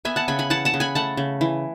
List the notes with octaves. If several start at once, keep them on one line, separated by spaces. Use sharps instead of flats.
B3 E5 G#5
F#5 A5
C#3 G#5 B5
G#5 B5
E3 F#5 A5
F#5 A5
C#3
G#5 B5
A3 F#5 A5
C#3
E3